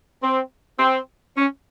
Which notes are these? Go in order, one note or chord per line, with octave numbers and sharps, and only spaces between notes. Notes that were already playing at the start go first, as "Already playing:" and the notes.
C4
C4
C#4